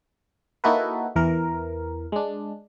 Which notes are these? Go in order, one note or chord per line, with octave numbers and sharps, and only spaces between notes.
A#3 D#4 E4 F#4 A4 B4
E2 E3 A#4
G#3 D4